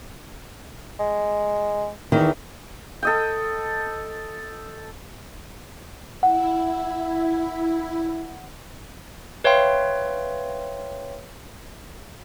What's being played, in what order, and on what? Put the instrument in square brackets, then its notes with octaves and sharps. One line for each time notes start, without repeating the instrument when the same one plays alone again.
[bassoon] G#3
[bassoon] E2 [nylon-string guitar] D#3 E3
[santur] A4 D#5 G5
[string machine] E4 [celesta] F#5
[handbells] B4 C#5 E5 F5 G5 C6